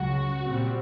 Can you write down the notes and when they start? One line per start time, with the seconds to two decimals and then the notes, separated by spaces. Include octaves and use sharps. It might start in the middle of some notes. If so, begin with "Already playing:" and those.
Already playing: C#2 C#3 F#3 F#4
0.45 A#2 G3 C4